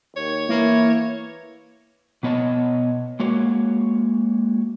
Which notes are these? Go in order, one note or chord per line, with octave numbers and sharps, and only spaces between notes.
D#2 C#5
E3 A#3 E4
B2 B3 C#5 D#5 A5
G#3 A#3 F#4 C#5